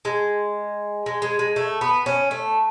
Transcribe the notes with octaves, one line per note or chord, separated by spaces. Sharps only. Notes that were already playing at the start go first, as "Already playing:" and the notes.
G#3
G#3
G#3
G#3
A3
B3
C#4
A3